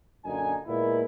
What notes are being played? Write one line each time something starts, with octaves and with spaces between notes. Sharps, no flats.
F#2 A#2 D3 D#4 G#5
A#2 G#3 A#3 B3 E4